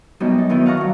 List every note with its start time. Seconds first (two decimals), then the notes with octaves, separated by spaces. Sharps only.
0.20 F#2 B2 G3 G#3 B3 D#4
0.38 A4
0.49 D#3 B3 D#4 E4 A4 B4
0.66 F5 F#5 A5 A#5 C#6
0.77 G2 F#3